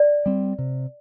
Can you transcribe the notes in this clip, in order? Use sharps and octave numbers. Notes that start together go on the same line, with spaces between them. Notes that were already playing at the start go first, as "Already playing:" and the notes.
Already playing: D5
G3 C4
C3